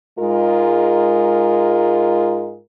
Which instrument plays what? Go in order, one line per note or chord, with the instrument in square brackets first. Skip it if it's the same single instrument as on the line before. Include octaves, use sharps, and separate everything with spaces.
[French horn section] G#2 G#3 F4 A#4